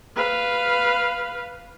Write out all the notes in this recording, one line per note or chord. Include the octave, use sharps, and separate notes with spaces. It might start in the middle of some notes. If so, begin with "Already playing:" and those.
B4 F5